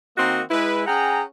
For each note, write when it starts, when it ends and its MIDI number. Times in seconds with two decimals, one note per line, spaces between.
0.18 0.41 51
0.18 0.41 58
0.18 0.41 60
0.18 0.41 66
0.18 0.41 75
0.18 0.41 84
0.51 0.84 56
0.51 0.84 64
0.51 0.84 71
0.86 1.23 61
0.86 1.23 68
0.86 1.23 78
0.86 1.23 79
0.86 1.23 82